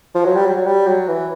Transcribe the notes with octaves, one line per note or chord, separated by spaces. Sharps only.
F3
F#3
G3
F#3
F#3
G3
F#3
E3